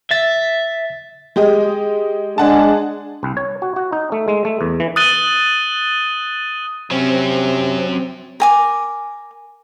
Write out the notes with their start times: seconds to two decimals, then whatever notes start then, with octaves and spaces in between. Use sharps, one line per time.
0.11 E5 A6
1.36 G#3 G4 D#5
2.38 G#3 D4 G#4 F#5 A5
3.23 C2
3.37 C#5
3.62 F#4
3.76 F#4
3.92 D#4
4.12 A3
4.28 G#3
4.45 A3
4.61 E2
4.80 E3
4.96 D#6 F#6 A6 D#7 G7
6.91 C3 F#3 C4 C#4
8.40 A#4 G#5 D6